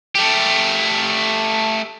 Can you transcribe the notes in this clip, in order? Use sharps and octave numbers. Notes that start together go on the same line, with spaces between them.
A3 G4